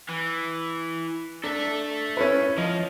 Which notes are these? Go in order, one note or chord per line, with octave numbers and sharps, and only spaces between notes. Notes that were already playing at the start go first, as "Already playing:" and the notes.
E3
D4 A4 E5
C#4 E4 B4
F3 D#5